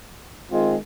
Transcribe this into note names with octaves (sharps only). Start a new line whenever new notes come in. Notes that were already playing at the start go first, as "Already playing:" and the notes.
D#3 G#3 C4 F4